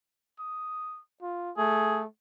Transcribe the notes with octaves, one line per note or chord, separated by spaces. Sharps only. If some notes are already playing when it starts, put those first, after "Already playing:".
D#6
F4
A3 G#4